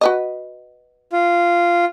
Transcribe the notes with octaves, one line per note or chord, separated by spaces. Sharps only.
F#4 B4 D#5
F4